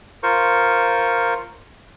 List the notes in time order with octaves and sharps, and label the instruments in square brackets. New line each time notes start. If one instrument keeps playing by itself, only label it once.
[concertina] F4 A#4 C5 C#6